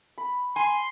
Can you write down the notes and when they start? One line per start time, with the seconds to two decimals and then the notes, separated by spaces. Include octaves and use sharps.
0.18 B5
0.56 G#5 C6